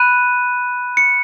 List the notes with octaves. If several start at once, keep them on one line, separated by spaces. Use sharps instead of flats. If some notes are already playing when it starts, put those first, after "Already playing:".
Already playing: B5 F#6 D#7
C#7